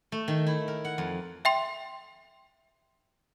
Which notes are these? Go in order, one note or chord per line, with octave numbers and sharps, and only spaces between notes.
A3
D#3
E4
A#4
F#5
F2
E5 G5 C6